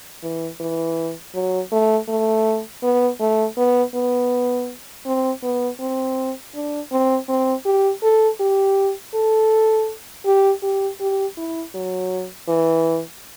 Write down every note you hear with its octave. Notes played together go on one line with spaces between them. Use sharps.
E3
E3
F#3
A3
A3
B3
A3
B3
B3
C4
B3
C4
D4
C4
C4
G4
A4
G4
A4
G4
G4
G4
E4
F#3
E3